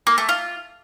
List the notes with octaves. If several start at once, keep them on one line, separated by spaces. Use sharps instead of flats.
A#3
A3
F4